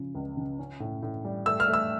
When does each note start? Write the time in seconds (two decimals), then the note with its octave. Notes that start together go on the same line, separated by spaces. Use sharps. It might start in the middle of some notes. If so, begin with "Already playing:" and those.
Already playing: C#3 F3
0.15 C#2
0.37 C#3
0.59 C#4
0.80 A2
1.03 A2
1.25 G3
1.46 A3 E6
1.60 F6
1.68 A3
1.74 E6